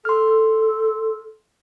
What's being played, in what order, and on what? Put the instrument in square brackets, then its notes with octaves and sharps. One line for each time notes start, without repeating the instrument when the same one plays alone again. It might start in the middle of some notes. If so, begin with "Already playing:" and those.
[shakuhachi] A4 [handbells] C6 F6